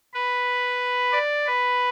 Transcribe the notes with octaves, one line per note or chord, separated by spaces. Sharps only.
B4
D5
B4